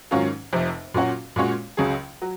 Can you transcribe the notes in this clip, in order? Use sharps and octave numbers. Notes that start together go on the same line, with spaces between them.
G#2 D#3 F#3 C#4 F4
F1 F2 C3
A#2 F#3 C#4 F#4
A#2 G#3 C#4 F#4 C#5
C#2 C#3 F#3 C#4 G#4
F#3